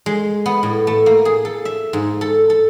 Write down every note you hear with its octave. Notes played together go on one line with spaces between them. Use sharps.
G#3
B3
A2
A3
A#3
G#4
A4
E5
G#2
A4
A4